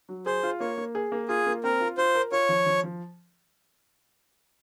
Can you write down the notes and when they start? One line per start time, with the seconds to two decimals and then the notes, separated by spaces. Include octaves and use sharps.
0.09 F#3
0.26 G#4 C5
0.43 F4
0.60 A#3 C#5
0.78 A#3
0.95 G#4
1.12 A#3
1.28 F4 G#4
1.46 A#3
1.64 C4 A#4
1.81 F4
1.98 F4 C5
2.15 A#4
2.32 F4 C#5
2.49 F3
2.66 F3
2.84 F3